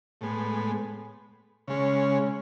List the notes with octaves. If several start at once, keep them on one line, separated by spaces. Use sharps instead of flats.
A2 G#3 B3
C#3 G#3 C#4